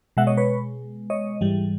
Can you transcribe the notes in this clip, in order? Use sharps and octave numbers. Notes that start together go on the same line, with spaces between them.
B2 G#3 E5 F#5
C#5 D#5
B4 C#5
C#5 D#5
G#2 E3 G3